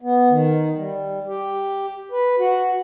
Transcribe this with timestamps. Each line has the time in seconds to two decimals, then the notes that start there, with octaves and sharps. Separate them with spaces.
0.01 B3
0.30 D#3
0.77 G3
1.27 G4
2.12 B4
2.39 F#4